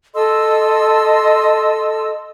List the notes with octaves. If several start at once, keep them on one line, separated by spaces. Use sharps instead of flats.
A4 D#5 C6 E6